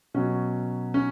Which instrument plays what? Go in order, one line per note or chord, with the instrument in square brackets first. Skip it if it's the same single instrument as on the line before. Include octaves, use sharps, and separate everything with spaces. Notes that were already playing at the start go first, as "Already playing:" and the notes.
[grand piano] B2 F#3 C#4
C#4